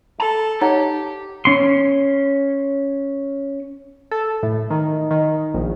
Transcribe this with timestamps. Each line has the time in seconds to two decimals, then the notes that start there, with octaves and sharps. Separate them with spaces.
0.20 A4 A5
0.62 D#4 G4 C#5 F#5
1.45 C#4 C6
4.11 A4
4.43 A2
4.71 D#3
5.11 D#3
5.54 A#1